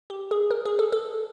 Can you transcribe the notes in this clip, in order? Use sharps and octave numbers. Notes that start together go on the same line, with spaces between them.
G4
G#4
A#4
G#4
A4
A4